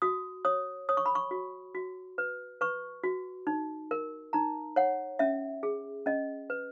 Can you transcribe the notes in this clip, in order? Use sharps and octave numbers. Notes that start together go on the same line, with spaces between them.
F#4 D#6
C#5 D#6
C#5 D#6
C#6
B5
C#6
F#4
F#4
B4
B4 C#6
F#4
D#4
A#4
D#4 A#5
C#5 F#5
C#4 E5
G#4
C#4 D#5
B4